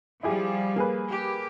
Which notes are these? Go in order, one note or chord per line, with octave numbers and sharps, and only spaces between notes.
F3 G3 E4 G4 G#4
A#3 G#4 B4
G4